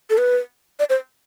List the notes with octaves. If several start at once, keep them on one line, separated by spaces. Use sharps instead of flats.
A4
B4
D5
C5